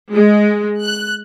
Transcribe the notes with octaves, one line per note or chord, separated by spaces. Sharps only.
G#3
F#6